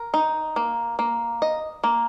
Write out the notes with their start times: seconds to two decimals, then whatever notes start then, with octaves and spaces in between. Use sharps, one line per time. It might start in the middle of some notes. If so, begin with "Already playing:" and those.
Already playing: A#4
0.14 D#4
0.56 A#3
0.99 A#3
1.42 D#5
1.84 A#3